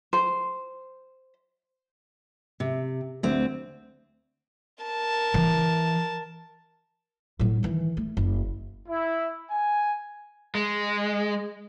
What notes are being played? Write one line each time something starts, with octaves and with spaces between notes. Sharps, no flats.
C5
C3
D2 C4
A#4 A5
E3
A2 F#3
D#3 E3
A3
F#1
E4
G#5
G#3